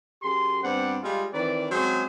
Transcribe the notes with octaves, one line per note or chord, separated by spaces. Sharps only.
F#2 G4 G#4 C6
G2 B3 C4 C5 D5 F#5
G3 G#3 F4
D#3 E3 C4 B4 D5
F#3 G#3 C4 C#4 G#4 C5